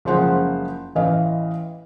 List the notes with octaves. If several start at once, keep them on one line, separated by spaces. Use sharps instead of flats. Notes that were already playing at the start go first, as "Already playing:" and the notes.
F#1 F3 G#3 C5 F#5
A1 E3 D#5 F5